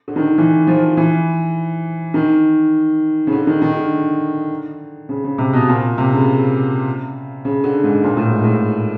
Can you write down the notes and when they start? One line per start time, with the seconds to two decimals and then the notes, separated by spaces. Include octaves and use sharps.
0.08 D3
0.16 D#3
0.24 D3
0.38 E3
0.67 F3
0.97 E3
2.14 D#3
3.27 C#3
3.33 D3
3.47 D#3
3.62 D#3
3.77 D3
5.09 C#3
5.24 C#3
5.38 C3
5.53 B2
5.69 A#2
5.98 C3
6.12 C#3
7.45 C#3
7.64 D3
7.84 G#2
8.04 A#2
8.17 A2
8.31 G#2
8.44 A2